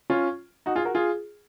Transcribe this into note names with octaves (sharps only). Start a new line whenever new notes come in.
C#4 F4
D#4 F#4
F4 G#4
F#4 A#4
F4 G#4